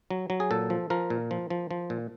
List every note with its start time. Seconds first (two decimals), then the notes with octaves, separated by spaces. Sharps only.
0.10 F#3
0.30 F#3
0.40 G#4
0.51 A#2 A4
0.70 F3
0.90 F3 A#4
1.10 A#2
1.31 F3
1.50 F3
1.71 F3
1.90 A#2